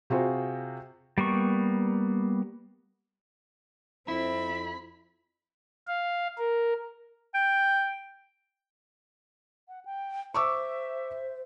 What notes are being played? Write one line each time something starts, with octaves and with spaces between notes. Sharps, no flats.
C3 F4 F#4 G#4 C5
G3 A#3 B3 C#6
F2 C4 E4 B5
F5
A#4
G5
F#5
G5
C5 E5 C#6 D6 E6